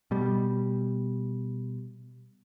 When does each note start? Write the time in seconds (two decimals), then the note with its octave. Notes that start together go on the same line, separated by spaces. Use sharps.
0.11 B2 G3